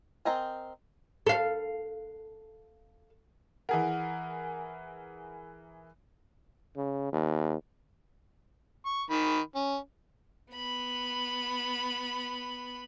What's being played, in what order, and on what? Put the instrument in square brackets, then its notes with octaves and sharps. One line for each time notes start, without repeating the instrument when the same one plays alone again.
[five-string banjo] C4 A#4 D#5 G#5
[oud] A4 F5
[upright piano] E3 G#4 A#4 [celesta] F#5
[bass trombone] C#3
D#2
[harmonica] C#6
D#3 B5
C#4
[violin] B3 B5